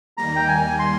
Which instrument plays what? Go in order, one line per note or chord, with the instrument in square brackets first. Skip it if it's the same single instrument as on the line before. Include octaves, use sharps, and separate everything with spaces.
[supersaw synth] D#2 D#3 G3 A#3 [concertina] A#5
[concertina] G5
G#5
C6